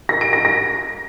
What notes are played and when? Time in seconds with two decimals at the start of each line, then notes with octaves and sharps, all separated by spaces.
0.09 A#6
0.21 D7
0.33 A#6
0.45 A#6